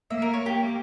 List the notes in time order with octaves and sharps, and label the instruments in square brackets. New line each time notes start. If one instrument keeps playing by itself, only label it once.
[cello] A#3 [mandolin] E5
[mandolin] A#4
C#5
[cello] A#3 [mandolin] G4